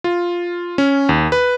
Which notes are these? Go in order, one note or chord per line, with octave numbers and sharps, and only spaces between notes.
F4
C#4
D#2
B4